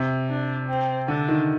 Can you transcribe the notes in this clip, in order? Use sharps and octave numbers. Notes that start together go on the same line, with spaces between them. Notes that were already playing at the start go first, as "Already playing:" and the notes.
Already playing: C3
D4
C4
D3 D4
D#3